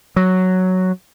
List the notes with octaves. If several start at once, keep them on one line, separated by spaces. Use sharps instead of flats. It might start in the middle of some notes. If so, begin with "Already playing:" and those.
F#3